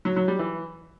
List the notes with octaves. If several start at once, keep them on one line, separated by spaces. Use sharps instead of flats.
F#3
F#3
G3
E3